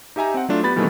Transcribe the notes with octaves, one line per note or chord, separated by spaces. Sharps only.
D#4 G4 E5 G#5 A#5
C4 F#5
F#3 A3 D4 F4
B3 G4 B5 A6
B2 D#3 E3 G3 A3 C4